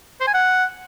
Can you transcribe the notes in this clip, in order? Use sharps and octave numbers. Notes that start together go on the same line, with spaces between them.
C5
G#5
F#5